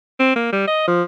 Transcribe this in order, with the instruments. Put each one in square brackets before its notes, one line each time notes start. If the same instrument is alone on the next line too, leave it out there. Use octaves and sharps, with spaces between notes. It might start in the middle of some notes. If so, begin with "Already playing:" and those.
[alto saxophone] C4
A#3
G3
D#5
F3